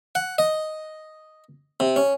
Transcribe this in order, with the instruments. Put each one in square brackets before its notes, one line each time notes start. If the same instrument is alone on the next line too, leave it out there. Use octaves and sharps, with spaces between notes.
[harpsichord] F#5
D#5
C3
C#4